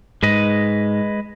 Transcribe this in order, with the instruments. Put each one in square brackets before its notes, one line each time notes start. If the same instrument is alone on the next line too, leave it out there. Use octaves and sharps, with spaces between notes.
[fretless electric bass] G#2 [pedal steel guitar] G#3 B4 D#5